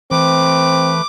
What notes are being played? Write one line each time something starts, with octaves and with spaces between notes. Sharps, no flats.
E3 A3 C4 B4 D6